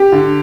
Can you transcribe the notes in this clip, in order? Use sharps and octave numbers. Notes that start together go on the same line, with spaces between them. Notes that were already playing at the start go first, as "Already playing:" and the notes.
Already playing: G4
D3